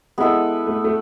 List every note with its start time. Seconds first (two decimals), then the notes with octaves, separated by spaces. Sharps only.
0.18 G#3 B3 E4 A4
0.67 A3
0.84 A3